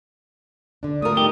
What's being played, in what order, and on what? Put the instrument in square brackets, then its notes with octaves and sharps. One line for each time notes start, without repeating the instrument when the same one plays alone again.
[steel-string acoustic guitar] D3 D4
[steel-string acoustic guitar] A3 F4 [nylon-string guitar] D4 A#4 [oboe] D#6
[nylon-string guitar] F3 G3 D#4 [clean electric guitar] G4